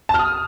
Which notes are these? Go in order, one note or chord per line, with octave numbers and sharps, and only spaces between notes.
A5
F6
D#6